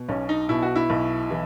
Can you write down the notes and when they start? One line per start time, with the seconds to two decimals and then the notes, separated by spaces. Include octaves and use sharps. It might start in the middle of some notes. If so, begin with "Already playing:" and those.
Already playing: B2
0.09 B1 C#4
0.29 D#4
0.49 B2 E4
0.62 F#4
0.76 E4
0.90 B1
1.30 E3